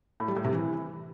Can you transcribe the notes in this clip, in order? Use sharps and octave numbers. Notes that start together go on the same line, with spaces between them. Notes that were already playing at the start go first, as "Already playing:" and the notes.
A2
G3
A2
C3
E3